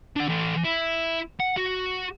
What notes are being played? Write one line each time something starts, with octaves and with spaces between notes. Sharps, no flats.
D4 F#5
E3 A4
E4
F#5
F#4